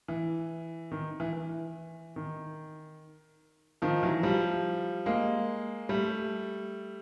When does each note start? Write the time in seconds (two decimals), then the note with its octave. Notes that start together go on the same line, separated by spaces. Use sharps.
0.08 E3
0.92 D#3
1.20 E3
1.33 E3
2.16 D#3
3.82 D#3 F3
4.03 E3 F#3
4.23 F3 G3
5.06 G#3 A#3
5.89 G3 A3